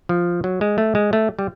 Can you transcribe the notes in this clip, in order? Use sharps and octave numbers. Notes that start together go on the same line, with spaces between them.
F3
F#3
G#3
A3
G#3
A3
G3